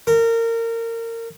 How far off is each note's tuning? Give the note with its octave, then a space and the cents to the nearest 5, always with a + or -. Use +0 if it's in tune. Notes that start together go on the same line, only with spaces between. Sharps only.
A#4 -25